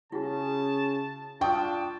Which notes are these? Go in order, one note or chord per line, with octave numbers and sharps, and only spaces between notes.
C#3 E4 F#4 G#4 A5
D4 F4 G5 A5 C#6 D#6 E6